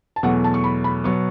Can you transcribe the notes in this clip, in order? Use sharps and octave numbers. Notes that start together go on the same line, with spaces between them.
A5
E2 B2 F#3 A3 F#5
A5
C#6
B5
B5
B2 F#3 B3 C#6